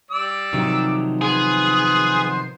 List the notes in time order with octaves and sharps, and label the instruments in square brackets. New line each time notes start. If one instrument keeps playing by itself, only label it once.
[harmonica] G3 D5 E6
[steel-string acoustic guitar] C3 F#3 [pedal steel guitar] D#3 F3 D#4
[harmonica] B3 C5 [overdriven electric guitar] G#4